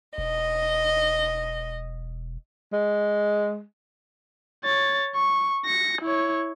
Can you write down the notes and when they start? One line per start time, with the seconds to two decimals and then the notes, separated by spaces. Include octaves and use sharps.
0.18 E1 D#5
2.73 G#3
4.64 C#5 A6
5.15 C#6
5.65 A#6 C#7
6.02 E4 C#5